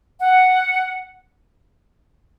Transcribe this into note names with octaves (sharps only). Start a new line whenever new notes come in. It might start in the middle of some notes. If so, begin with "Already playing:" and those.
F#5